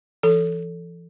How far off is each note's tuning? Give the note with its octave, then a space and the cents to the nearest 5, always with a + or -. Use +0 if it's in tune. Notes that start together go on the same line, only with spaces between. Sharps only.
E3 +35 A4 +0